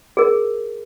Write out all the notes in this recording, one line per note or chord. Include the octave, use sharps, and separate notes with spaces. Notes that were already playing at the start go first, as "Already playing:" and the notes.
G#4 A#4